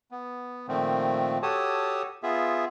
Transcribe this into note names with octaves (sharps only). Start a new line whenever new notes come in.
B3
A#2 D#3 F3 A3 C4
F#4 G4 A4 C#5 A5 D#6
B3 F4 G#4 E5